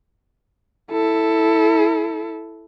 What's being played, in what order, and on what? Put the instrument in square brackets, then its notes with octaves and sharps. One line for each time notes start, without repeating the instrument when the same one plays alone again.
[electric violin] E4 A4